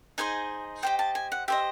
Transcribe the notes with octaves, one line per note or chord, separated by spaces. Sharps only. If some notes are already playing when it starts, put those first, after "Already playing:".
D#4 G#4 C5 D#5 G#5
G4 C5 D#5 G5
A5
G#5
F#5
G4 C5 D#5 E5